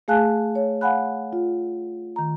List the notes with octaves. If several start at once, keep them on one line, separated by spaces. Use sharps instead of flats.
A3 G#4 F5 G#5 A5 F#6
C#5
F5 F#5 G#5 B5 F#6
F4
D#3 A#5